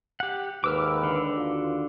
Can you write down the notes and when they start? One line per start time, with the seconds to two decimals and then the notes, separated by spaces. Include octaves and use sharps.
0.20 G4 F#5
0.64 D#2 G#2 B4 D6 E6 F6
1.03 D3
1.36 D#2 F4 F#4